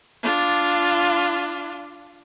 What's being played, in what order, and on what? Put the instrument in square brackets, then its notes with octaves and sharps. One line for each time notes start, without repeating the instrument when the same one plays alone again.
[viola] D4 F4